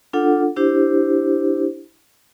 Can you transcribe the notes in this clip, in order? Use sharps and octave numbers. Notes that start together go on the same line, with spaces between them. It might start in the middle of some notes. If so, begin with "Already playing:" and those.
D4 F4 A4 F#5
D4 E4 G4 C5